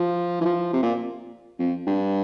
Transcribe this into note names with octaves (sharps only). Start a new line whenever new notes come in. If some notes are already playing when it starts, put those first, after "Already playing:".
Already playing: F3
E3
F3
C3
A#2
F2
G2